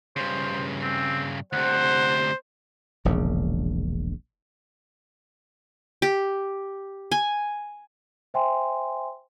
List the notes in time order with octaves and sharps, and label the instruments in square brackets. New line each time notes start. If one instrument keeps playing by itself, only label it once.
[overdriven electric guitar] G2 C#3 [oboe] C5
[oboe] C4
[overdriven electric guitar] D2 C3 [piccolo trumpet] C5 [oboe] F#5
[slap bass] E1 A#1 E2 C#3
[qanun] G4
G#5
[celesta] C5 E5 G5 G#5 C6